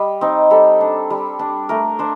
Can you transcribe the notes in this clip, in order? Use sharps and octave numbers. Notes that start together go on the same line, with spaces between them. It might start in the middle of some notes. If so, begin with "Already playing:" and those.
Already playing: G3 D#5
C4 D#4
G3 A4
D4
G3
D4
A3 A#4
D4 C5